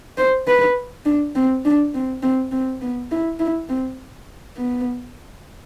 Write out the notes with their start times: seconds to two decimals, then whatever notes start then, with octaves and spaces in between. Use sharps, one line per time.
0.18 C5
0.47 B4
1.05 D4
1.35 C4
1.65 D4
1.94 C4
2.22 C4
2.52 C4
2.82 B3
3.11 E4
3.40 E4
3.69 C4
4.57 B3